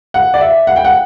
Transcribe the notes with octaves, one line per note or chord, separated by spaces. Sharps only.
F#5
D5
E5
F#5
G5
F#5